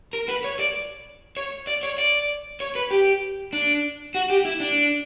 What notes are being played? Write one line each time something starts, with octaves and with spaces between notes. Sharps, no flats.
A#4
B4
C#5
D5
C#5
D5
C#5
D5
C#5
B4
G4
D4
F#4
G4
E4
D4